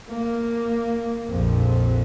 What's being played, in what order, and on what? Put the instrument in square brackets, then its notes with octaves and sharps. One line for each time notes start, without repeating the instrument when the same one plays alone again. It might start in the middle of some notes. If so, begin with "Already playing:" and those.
[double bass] A#3
A#1 F2